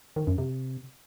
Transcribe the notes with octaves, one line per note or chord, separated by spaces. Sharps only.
D#3
F#2
C3